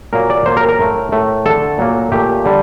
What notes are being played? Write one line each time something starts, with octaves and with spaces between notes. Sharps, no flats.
A#2 F#3 A#3 A#4
D5
A#2 F#3 A#3 C5
A#4
A#4
A2 A3
A2 A3
D3 A3 A4
A#2 F#3 A#3
A#2 A3 G4
D3 G3